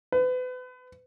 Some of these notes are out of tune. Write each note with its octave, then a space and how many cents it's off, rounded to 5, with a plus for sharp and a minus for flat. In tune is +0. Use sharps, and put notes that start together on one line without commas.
B4 +35